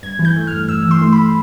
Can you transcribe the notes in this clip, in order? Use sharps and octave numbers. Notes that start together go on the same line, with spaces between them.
G2 G#6
E3
G6
A3
F6
G2
G2 E6
E3
C6
A3
B5